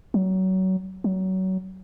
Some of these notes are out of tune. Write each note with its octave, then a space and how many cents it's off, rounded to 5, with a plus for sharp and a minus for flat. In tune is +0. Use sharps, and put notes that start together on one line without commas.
F#3 +25
F#3 +25